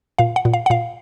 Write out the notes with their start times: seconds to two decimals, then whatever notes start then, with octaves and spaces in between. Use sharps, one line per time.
0.19 A#2 F5
0.36 F#5
0.45 A#2
0.53 F5
0.66 F#5
0.70 A#2 F5